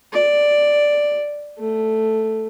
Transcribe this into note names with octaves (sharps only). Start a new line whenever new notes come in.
D5
A3